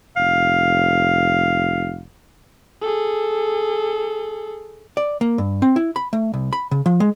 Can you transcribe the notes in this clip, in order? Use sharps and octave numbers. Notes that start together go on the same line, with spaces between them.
F1 F5
G#4 A4
D5
A#3
G2
C4
E4
B5
A3
C2
B5
C#3
F3
G#3